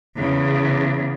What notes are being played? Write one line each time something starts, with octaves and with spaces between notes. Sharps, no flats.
E2 C#3